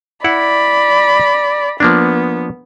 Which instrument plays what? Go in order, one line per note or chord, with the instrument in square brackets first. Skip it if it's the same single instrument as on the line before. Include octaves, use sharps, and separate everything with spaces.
[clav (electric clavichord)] E4 F#5 [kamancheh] D5 B5
[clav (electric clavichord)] F3 A#3 D4 [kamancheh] B3